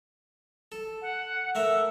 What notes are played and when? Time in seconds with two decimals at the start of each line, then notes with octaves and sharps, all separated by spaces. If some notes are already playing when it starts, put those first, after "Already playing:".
0.72 A4
1.02 F#5
1.55 A3 A#4 E5 E6